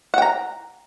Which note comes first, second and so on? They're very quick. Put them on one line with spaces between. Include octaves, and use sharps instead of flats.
F#5 G5 A#5